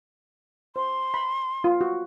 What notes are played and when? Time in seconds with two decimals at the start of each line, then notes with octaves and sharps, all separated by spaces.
0.76 C5 C6
1.14 B5
1.64 F4
1.81 F#4